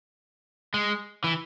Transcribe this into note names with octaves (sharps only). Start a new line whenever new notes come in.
G#3
E3